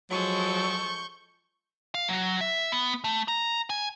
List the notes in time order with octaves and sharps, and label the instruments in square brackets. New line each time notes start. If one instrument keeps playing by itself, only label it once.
[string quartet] F3 G#3 A4 [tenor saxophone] F#3 [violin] C#6 G6
[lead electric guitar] F5
F#3
E5
B3
A3
A#5
G#5